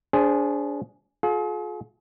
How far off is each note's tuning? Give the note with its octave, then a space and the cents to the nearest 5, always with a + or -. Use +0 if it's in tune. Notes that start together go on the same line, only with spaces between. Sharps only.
D4 -25 G#4 +0 C5 +0
F4 +35 G#4 +40